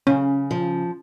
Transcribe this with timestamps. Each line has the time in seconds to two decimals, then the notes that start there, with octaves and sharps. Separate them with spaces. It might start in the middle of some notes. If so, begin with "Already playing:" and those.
0.07 C#3 C#4
0.51 F3